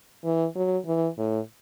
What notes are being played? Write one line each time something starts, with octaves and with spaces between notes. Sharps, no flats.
E3
F#3
E3
A2